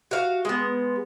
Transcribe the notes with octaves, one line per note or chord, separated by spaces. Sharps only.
F#4 F5
G#3 B3